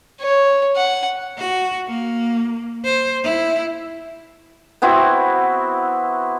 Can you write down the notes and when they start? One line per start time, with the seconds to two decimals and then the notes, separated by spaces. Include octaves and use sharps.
0.21 C#5
0.76 F#5
1.38 F#4
1.87 A#3
2.85 C5
3.24 E4
4.82 B3 C4 E4 F#4